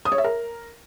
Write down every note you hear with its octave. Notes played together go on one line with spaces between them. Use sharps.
D#6
C#5
E5
A#4